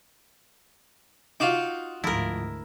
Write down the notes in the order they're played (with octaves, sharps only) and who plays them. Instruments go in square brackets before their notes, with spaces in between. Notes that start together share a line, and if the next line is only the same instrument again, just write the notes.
[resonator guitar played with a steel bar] D#4 F5 [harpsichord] F4 F#4 D6
[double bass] D2 G#2 [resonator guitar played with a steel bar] F3 [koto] E4 A#4